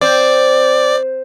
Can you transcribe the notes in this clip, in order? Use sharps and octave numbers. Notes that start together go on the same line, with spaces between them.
C4 D5